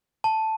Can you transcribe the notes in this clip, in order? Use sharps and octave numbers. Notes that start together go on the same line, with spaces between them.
A5